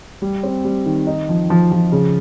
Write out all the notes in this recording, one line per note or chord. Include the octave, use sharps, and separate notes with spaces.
G3
C4
G3
D#3
D#4
F3
F3
F3
C#3